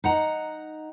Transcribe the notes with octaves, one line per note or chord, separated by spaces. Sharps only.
D#4 F#5 A#5